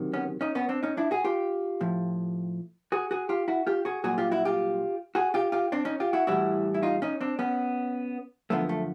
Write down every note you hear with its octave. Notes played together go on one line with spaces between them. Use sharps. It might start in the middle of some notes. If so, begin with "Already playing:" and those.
Already playing: D2 C3 D#3 F#3
B3 C#4
C#4 D#4
B3 C#4
C4 D4
C#4 D#4
D4 E4
F#4 G#4
F4 G4
A2 F3
F#4 G#4
F#4 G#4
F4 G4
E4 F#4
F4 G4
F#4 G#4
C2 A#2 F#3 F#4 G#4
F4 G4
E4 F#4
F4 G4
F#4 G#4
F4 G4
F4 G4
C4 D4
C#4 D#4
F4 G4
E4 F#4
A2 E3 G3 E4 F#4
E4
D#4 F4
C#4 D#4
C4 D4
B3 C#4
F#2 D3 F3 A3 B3
A3